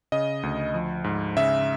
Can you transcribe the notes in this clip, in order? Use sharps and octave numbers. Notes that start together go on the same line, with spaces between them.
C#3 D#5
D2
F3
G#2
C#3 E5